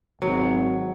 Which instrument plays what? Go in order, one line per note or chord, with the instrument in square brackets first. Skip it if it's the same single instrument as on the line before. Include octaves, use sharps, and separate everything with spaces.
[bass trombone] G#1 [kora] F#3